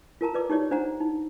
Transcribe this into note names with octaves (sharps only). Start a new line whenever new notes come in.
F4 A#4 A5 A#5
B4 D5 D6
D#4 G4 C#5 D5
D4 C5 F#5 A#5
D#4